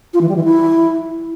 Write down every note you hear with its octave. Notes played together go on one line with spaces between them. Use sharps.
F4
E3
G3
E3
E4